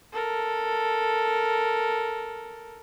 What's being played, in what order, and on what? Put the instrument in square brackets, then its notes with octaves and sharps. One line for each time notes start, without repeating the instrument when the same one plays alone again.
[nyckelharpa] A4 A#4